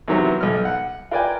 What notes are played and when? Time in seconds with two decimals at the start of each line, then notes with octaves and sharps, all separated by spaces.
0.08 E2 C3 D#3 F#3 B3
0.41 B1 F6
0.65 F#5
1.11 F4 A#4 B4 D5 G5 G#5